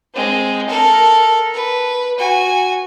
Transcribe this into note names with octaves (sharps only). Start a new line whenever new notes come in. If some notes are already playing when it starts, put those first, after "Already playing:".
G#3 C4
A4 A#4
B4
F#4 G#5